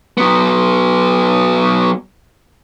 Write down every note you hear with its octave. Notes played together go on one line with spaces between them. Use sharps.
F#3 B3